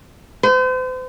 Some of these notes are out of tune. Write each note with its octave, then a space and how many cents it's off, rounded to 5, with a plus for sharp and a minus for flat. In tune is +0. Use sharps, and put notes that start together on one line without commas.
C5 -40